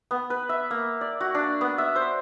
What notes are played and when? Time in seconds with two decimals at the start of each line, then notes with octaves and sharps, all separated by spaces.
0.11 B3
0.30 B4
0.49 E5
0.71 A#3
1.01 D5
1.21 F#4
1.35 D4
1.61 B3
1.78 E5
1.96 C5